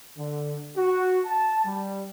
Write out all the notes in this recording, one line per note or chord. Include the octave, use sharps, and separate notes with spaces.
D3
F#4
A5
G3